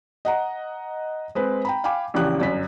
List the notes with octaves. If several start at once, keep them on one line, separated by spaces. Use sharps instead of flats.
D#5 F#5 A#5
G#3 C4 B4
G5 A#5 B5
F5 G5 G#5 B5 D6
A#1 E2 C#3 G4 F#6
G1 F#2 B6